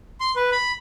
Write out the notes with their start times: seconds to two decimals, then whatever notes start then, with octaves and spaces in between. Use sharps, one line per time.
0.20 C6
0.36 B4
0.52 B5